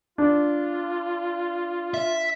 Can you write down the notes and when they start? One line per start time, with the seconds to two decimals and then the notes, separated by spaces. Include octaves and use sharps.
0.18 D4 F4
1.94 E5